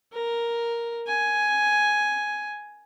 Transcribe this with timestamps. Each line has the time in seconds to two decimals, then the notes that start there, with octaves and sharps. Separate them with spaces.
0.13 A#4
1.07 G#5